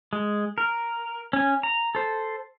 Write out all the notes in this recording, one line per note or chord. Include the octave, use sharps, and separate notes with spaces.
G#3
A#4
C#4 G#5
A#5
A4 C5